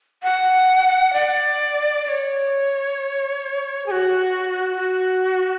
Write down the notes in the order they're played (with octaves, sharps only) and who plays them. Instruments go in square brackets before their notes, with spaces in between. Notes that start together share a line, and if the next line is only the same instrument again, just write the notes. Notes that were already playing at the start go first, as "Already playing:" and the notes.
[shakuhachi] F#5
D5
D5
C#5
G#4
F#4
F#4